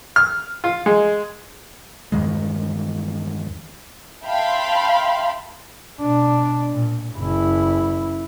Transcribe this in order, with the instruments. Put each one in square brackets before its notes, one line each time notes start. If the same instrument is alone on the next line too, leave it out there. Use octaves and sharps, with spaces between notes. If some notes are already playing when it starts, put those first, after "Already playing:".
[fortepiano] F6
F4
G#3
[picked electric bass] E2 G2 D#3 G#3
[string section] E5 F5 G5 A5 B5 C6
[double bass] B2 D4
A#2
F#1 E4